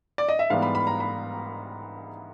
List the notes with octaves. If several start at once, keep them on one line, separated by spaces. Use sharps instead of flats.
D5
D#5
E5
G#2 E3 G3 B3 F5
B5
B5
A#5
B5